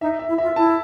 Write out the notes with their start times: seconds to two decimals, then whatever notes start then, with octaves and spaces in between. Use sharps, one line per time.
0.01 D#4 E5
0.19 E5
0.28 E4
0.38 F4 E5
0.56 E4 A5